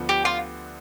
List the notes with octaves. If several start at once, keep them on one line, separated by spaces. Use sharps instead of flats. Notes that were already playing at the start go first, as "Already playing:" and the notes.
Already playing: D2 D3 F3 B3 D4
G4
F4